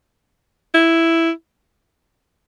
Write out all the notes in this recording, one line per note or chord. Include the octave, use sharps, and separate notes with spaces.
E4